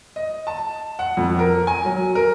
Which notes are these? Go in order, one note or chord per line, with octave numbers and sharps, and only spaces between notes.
D#5
A5
F#5
F2
A#4
G#5
F#3
A#4